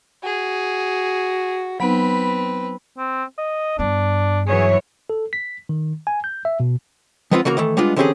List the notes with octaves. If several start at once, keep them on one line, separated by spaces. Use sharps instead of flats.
F#4 G#4
F#3 B3 C4 D#4 B4 B5
C4
D#5
G2 B3 D4
E3 F#3 G#4 C#5
A4
B6
D#3
G#5
G6
E5
B2
F3 G#3 B3 C4 E4 F4
C#3 E3 A#3 F#4 A#5
D#3 E3 A3
G3 G#3 B3 D4 F4
D3 E3 C4 C#4 G4 G#4